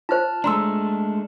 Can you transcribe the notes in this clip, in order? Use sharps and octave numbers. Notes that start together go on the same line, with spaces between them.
F4 C5 A5 F6
G#3 A3 D4 A#5 C6 E6